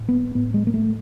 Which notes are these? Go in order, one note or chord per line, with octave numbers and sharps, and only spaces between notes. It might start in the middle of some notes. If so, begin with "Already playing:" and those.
Already playing: A2
B3
A2 B3
G#3
A#3
A3